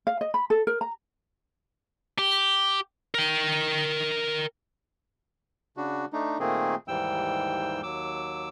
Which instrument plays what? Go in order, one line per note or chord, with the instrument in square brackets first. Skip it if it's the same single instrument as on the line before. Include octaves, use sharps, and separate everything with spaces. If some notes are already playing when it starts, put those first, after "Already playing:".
[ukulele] F5
D#5
B5
A4
A#4
A#5
[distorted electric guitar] G4
A#4 G5
[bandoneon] C#3 D4 F#4
A3 D4 D#4
A#2 D#3 A3 A#3 C4 G#4
D#2 G#2 E3 G3 G5 E6
D#2 F#3 D6 E6